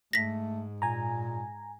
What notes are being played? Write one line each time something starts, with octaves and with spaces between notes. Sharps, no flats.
G#2 A3 A#6 B6
A#2 G#5 A#5